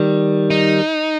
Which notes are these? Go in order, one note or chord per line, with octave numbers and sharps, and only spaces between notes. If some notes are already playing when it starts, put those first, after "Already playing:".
Already playing: D#3 G3
D#4